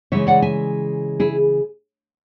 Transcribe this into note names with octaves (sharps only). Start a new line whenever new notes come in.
C#3 E3 G#3 C#5 E5
D5 F#5
E5 G#5
E4 G#4